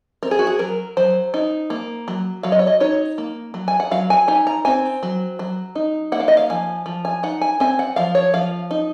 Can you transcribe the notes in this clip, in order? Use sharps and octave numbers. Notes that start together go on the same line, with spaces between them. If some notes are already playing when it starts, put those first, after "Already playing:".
C4 A#4
G#4
F#4
G#4
F#3 A#4
F#3 C5
D#4
A#3
F#3
F#3 F5
D#5
C#5
D#5
D#4 C#5
A#3
F#3
G#5
F#5
F#3 F5
G#5
D#4 G#5
A#5
C4 G#5
F#3
F#3
D#4
A#3 F#5
F5
D#5
F5
F3 G#5
F3
G#5
D#4 F#5
G#5
C4 G#5
F#5
F3 F5
C#5
F3 F5
D#4